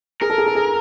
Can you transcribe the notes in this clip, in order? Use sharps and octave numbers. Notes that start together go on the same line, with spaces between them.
G#4 A#4
A4
G#4
A4
G#4